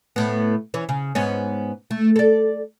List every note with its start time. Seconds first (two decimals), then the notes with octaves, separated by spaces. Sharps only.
0.16 A2 B3
0.74 E3 C#4
0.89 C#3
1.15 G#2 B3 C#4
1.91 A3
2.16 A4 D5